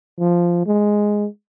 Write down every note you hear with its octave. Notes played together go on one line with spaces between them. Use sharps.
F3
G#3